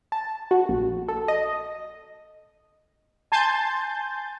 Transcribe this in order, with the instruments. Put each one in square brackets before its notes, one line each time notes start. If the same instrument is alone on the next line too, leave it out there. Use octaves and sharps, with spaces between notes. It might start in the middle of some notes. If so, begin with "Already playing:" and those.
[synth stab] A5
F#4
A#1
A4
D#5
G#5 A5 C6 G6 A6